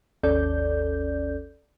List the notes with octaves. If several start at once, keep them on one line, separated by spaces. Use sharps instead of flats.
G#1 D#2 C#4 A4 D5 G6